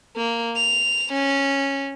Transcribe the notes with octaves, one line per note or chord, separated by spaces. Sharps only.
A#3
F7
C#4